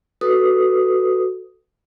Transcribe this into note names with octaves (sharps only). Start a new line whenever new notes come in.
F#4 A4 B4 D#6